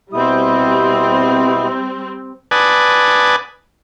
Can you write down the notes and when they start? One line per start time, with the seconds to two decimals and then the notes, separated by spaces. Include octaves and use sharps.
0.13 B2 G3 C4 E4 D#6
2.51 B4 D5 F#5 G#5 A5 D#6